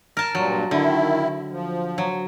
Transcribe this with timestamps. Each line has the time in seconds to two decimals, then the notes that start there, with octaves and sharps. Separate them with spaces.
0.17 A#4 A5
0.35 G2 A#2 F#3
0.71 D3 D#3 E4
1.51 F3
1.98 F#3